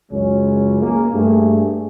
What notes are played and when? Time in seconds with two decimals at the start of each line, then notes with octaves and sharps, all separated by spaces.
0.11 C#2 F#2 G#3 C#4
0.83 A#3 G#4
1.13 G2 A3 G#4